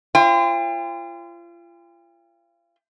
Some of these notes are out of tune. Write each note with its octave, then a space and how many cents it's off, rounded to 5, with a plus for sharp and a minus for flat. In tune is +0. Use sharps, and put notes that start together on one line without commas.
F4 -35 C5 +20 G5 +40